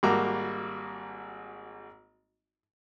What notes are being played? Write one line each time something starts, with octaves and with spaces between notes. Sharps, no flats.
G#1 G3 A#3 F#4 A#5 D6